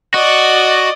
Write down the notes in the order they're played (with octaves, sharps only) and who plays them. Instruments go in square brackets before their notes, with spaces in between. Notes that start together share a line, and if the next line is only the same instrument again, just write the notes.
[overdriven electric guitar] F#4 [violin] D5 D#5